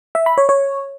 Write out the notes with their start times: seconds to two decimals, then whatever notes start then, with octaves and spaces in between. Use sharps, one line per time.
0.15 E5
0.26 B5
0.38 C#5
0.49 C#5